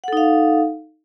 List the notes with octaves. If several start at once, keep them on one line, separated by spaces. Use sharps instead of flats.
D#4 A4 F5 F#5